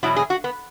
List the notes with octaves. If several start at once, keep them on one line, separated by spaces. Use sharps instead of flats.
E2 B2 F#3 E4
G#4
F#4
B3